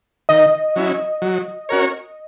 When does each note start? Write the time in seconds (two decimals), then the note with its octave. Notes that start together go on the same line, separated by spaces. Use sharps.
0.29 D#3 D#5
0.76 F#3 C#4 E4
1.22 F#3
1.69 C#4 F#4 A#4 C#5